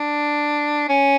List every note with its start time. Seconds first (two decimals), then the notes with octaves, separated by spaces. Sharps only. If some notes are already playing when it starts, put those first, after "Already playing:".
Already playing: D4
0.89 C#4